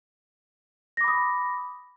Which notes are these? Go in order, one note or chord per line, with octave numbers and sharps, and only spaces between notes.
B5 D6 D#6 A#6